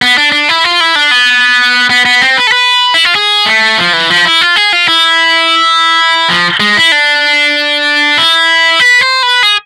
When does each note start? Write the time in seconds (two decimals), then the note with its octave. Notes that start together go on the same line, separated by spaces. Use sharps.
0.02 B3
0.18 D4
0.32 D4
0.49 E4
0.64 F4
0.80 E4
0.95 D4
1.11 B3
1.90 B3
2.05 B3
2.21 C4
2.37 B4
2.47 A4
2.52 B4
2.94 E4
3.05 F4
3.15 G#4
3.46 A3
3.78 F3
3.93 E3
4.10 F3
4.25 E4
4.41 F4
4.56 G#4
4.73 F4
4.88 E4
6.29 F3
6.60 G#3
6.77 E4
6.92 D4
8.18 E4
8.80 B4
9.01 C5
9.23 B4
9.43 G#4